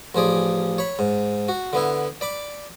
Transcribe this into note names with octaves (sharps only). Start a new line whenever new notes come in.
A1 F3 G#4 D5
C#5 B5
G#2
F#4
D3 B3 E4
D5 B5 D6